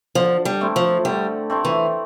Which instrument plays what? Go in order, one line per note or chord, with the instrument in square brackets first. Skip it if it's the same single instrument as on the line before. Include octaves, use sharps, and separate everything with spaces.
[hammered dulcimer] D3 [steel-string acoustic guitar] F3
[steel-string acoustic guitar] G3
[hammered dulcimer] A3 C4 E4
[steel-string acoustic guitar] F3
[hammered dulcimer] D3 [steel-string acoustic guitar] G3
[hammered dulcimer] A3 C4 E4
[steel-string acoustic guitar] E3